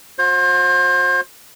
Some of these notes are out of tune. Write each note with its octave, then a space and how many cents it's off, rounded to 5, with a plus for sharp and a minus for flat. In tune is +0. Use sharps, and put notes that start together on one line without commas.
F#4 -40 C5 +30